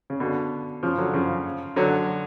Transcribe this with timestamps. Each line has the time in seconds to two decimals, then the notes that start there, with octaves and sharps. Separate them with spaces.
0.10 C#3
0.20 B2 D3
0.83 C#3 F3
0.98 D3 F#3
1.13 C#3 F3
1.76 D3 F#3